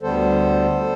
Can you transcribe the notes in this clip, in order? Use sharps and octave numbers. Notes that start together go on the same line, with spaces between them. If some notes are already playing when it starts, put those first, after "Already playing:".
D2 D3 G3 B3 A4 C5